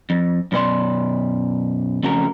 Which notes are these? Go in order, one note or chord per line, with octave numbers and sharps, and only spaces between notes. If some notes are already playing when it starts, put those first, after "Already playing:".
F2
F#2 B2 B4 D5 C6
F2 C#3 A3 F#4 A#4